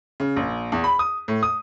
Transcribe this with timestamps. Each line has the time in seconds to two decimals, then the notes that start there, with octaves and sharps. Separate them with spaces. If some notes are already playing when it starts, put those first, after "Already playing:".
0.20 C#3
0.36 A#1
0.72 E2
0.84 B5
0.99 D#6
1.28 A2
1.43 D#6